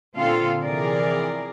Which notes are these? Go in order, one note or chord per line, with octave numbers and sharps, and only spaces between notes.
A#2 D3 C4 F4 A4 F5
C3 E3 F3 G#4 A#4 D5